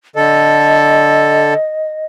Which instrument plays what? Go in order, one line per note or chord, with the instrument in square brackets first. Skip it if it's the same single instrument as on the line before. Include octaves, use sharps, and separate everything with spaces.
[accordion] D3 A4 [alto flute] D#5